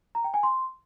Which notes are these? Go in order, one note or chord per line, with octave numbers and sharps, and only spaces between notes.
A#5
G5
G#5
C6